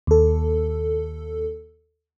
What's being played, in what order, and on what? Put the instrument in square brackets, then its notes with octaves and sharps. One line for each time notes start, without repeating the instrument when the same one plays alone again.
[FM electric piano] D#2 A4